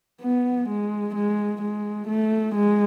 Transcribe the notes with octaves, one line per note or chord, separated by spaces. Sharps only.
B3
G#3
G#3
G#3
A3
G#3